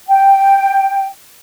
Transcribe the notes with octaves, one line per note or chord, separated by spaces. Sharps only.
G5